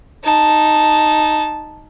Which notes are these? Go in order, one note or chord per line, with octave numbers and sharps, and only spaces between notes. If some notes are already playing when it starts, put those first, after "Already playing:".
D#4 A5